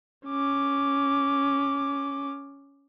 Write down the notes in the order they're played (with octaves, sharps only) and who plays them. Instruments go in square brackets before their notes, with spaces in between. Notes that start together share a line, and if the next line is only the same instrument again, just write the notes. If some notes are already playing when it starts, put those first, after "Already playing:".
[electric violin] C#4 D6